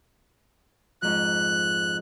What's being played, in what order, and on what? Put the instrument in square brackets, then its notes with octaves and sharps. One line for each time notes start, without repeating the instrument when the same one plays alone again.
[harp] F2 G#2 F3 [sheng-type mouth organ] F#6